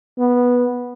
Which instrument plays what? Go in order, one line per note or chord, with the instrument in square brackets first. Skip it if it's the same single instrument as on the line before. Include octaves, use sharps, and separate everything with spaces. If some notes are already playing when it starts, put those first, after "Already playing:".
[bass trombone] B3